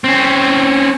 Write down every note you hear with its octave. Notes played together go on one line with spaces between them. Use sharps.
C4 C#4